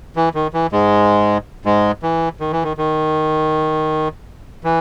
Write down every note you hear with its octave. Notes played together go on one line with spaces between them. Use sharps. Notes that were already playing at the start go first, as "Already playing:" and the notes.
E3
D#3
E3
G#2 G#3
G#2 G#3
E3
D#3
E3
D#3
D#3
E3